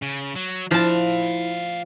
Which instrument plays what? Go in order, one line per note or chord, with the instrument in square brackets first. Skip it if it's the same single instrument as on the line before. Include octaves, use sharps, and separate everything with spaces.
[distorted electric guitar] C#3
F#3
[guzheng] F3 A5 [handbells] E4 [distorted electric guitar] D5 F5